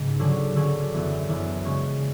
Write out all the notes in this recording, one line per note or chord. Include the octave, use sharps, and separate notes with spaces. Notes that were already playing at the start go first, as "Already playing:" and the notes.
Already playing: G#2 C#3 B3
D3 F#3 C#4 G#4
D3 F#3 C#4 G#4
F#2 E3 B3
F#2 E3 B3
C#3 G#3 C#4